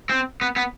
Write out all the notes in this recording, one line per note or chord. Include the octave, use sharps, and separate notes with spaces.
C4
B3
B3